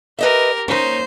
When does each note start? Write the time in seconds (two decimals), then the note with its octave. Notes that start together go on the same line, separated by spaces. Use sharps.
0.19 G4 A#4 B4 D#5 E5
0.68 A#3 C#4 D#4 C5